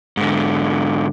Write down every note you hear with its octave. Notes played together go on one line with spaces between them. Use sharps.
G#2 D3